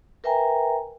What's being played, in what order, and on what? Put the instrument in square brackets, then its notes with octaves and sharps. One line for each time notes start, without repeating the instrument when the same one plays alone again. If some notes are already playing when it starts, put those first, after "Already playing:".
[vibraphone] A#4 B4 E5 G5 G#5 A#5